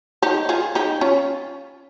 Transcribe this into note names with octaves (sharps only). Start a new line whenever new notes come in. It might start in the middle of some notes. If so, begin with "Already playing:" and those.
D#4 G4
F4 G#4
D#4 G4
C#4 F4